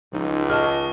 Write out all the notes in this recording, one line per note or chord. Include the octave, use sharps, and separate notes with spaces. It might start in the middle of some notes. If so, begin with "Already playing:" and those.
C#2 F3 D#4
G#4 D#5 A5 C#6 F6